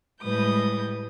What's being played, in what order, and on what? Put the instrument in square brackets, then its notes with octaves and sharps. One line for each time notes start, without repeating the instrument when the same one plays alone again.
[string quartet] A2 G3 G#3 B4 D#6 G6